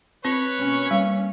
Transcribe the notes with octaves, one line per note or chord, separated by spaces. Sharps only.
C4 B4 C#5 C#6
B2 A#3 C#4
G3